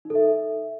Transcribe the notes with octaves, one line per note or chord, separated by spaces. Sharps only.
D#4
A4
E5